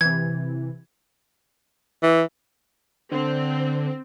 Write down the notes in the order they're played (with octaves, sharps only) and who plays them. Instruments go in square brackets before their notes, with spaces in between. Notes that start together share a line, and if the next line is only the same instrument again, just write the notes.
[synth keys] C3 E3 [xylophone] G#6
[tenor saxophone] E3
[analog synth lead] D3 [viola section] C4